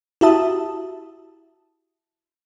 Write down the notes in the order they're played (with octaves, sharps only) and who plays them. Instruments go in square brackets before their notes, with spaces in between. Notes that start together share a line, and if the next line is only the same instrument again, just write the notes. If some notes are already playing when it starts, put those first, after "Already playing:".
[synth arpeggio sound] E4 F#4 G4 E5 A5 D#6